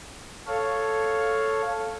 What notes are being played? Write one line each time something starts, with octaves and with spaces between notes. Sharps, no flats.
A4 C#5 F5